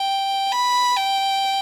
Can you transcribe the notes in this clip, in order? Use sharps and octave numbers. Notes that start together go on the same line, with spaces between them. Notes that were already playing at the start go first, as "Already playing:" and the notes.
Already playing: G5
B5
G5